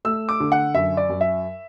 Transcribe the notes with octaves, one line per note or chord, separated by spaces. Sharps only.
A3 E6
D6
D3
F#5
F#2 E5
D5
F#2
E5